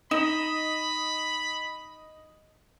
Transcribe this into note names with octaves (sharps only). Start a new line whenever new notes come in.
D#4 D#5 B5 D#6 E7